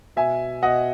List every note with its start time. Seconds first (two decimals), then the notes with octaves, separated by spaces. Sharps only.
0.16 B2 E5 G#5
0.62 B2 D#5 F#5